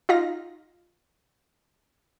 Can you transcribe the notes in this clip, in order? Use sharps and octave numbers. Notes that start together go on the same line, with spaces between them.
D#4 F4 F5 A#6